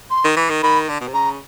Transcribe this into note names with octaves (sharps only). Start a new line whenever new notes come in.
C6
D#3
E3
D#3
D#3 B5
D3
B2
C3
C#3 A#5